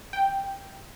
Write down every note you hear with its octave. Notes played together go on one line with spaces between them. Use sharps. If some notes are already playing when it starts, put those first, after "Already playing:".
G5